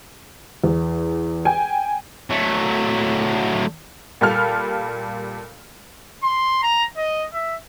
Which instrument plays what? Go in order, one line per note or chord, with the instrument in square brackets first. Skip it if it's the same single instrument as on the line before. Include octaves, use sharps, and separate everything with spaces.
[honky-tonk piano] E2
G5 G#5
[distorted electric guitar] F#3 A3
[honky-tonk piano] A#2 G3 F4 A4 F6
[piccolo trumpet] C6
A#5
D#5
E5